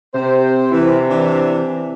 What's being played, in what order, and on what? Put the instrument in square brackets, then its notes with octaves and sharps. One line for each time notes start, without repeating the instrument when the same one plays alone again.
[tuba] C3 [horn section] C4 G4 C5
[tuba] C3 [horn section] E3
[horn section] E3 D4